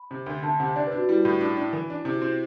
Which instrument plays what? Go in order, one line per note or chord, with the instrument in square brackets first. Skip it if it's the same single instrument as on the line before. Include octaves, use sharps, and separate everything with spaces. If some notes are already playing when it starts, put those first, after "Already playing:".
Already playing: [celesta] B5
[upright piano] C3
D2
[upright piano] D2 [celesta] A5
[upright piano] C3 [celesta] F#5
[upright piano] D4 [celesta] D5
[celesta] B4
[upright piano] D4
[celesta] F#4
[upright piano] G3 [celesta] E4
[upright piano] A2
D4
D4
E3
D4
[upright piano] C3 [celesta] E4
[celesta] F#4
[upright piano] C4 [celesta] E4